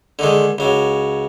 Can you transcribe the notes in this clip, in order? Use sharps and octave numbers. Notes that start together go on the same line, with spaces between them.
D3 D#3 G#3
C#2 F#3